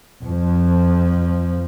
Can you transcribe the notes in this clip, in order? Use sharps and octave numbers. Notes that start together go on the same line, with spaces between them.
F2 F3